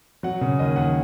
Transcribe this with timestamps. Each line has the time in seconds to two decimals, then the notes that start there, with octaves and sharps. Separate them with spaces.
0.23 F#3 F#5
0.41 C#3
0.59 D#2 D#5
0.76 D#2 F#5